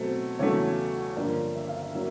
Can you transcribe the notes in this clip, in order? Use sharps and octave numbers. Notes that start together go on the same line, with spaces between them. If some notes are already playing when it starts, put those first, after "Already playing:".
Already playing: B2 F#3 A3 C4
E2 C#3 F#3 A3 C#5
G2 D3 F3 A#3 D5
E5
F5
E5
F#3 A#3 C#4 E5